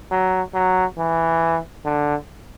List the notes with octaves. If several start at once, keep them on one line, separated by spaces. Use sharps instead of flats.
F#3
F#3
E3
D3